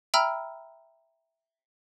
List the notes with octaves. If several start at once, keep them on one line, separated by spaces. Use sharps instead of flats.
E5 G5 A#5 B5 E6 F6